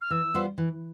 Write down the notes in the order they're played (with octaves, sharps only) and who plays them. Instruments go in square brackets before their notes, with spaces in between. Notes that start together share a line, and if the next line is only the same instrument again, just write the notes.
[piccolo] F6
[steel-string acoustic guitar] E3 [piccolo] E6
[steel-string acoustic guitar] G3 B3 F4 C5
E3